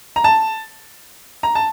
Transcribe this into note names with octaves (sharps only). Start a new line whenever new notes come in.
A#5
A5
A#5
A5